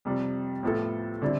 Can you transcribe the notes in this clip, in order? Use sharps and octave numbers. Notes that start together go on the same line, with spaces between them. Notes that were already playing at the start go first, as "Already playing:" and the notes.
F2 C3 G3
A2 F3 B3 E4 A4
D3 G3 C4 E4